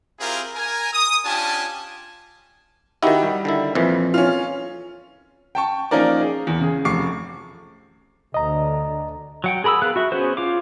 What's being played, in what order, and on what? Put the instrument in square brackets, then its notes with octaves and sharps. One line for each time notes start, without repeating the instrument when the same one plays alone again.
[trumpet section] C4 E4 F4 G4 G#4 A#4
A#4 G#5
D#6
C#4 D4 F4 G4 G#5 A5
[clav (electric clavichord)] D#3 E4 [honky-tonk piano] D#4 F#4 G4
[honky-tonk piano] G3
[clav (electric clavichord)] D3 D#3 E4
F2 A#2 E3
[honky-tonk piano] C#4 F4
[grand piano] G5 A5 C#6
F3 A#3 C#4 D#4 A#4 D5
G#4
E2
C#3 G#4
F1 C#6 D6 C7
[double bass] D2 D3 [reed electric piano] D#5 A#5
[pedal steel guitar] F#3 F#5 G5
G#4 A#4 B5 D#6 E6
B3 G#4 F5 F#6
F#4 E5
B3 C#4 F#4 G#4 C5
F4 C#5 F5 D6